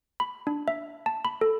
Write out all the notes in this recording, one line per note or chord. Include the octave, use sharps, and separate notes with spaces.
B5
D4
E5
A5
B5
A4